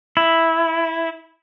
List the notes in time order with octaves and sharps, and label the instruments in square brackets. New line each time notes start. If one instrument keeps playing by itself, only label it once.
[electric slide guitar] E4